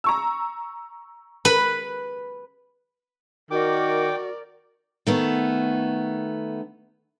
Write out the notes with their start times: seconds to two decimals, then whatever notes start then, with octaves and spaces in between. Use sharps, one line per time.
0.04 A#5 C#6 E6
1.45 B4 F#7
3.51 D#3 F#4 A#4 D5 G5 D6
5.07 D#3 A3 B3